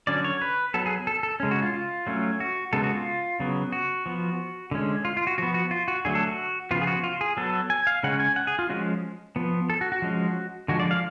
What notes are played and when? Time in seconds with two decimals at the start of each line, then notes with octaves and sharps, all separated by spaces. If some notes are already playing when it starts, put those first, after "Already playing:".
0.07 D3 F#3 C#4 D5
0.24 C#5
0.42 B4
0.74 F#3 B3 A4
0.86 G#4
1.07 A4
1.23 A4
1.40 C#3 G#3 C#4
1.51 F#4
1.62 F4
1.73 F4
2.07 F#3 A3 C#4
2.40 F#4
2.73 C#3 G#3 B3 A4
2.83 F#4
2.95 F4
3.40 C#3 F#3 B3
3.72 F#4
4.06 F3 B3
4.71 D3 G#3 C#4
5.05 F4
5.17 F4
5.27 F#4
5.38 F3 B3 F#4
5.54 F#4
5.71 F4
5.88 F#4
6.05 D3 F#3 A3 G#4
6.15 A4
6.27 F#4
6.71 C#3 F3 B3 F4
6.81 G#4
6.87 F#4
7.04 F4
7.21 G#4
7.37 F#3 B3 A4
7.70 G#5
7.87 F5
8.03 C#3 G#3 C#4 F#5
8.20 G#5
8.36 F#5
8.47 G#4
8.59 F4
8.69 F3 G#3 C#4 F#4
9.36 F3 B3
9.70 A4
9.81 F#4
9.92 F#4
10.02 F3 G#3 C#4
10.68 D3 F3 G#3 F#4
10.80 D5
10.91 F5